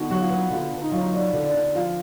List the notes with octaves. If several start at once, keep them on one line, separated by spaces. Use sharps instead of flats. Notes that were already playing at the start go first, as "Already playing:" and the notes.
Already playing: D3 B3 D#4 F#4
F#3 F#4
F4
B3
D3 F4
D3
D#4
F#3 F4
D#4
B3 D4
D3
D4
D3
F3 F4